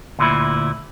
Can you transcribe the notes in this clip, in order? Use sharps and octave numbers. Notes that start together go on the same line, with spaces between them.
D2 A#2 E4